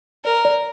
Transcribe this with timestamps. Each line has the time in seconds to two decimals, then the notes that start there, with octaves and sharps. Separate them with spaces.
0.25 A#4 D5
0.45 D5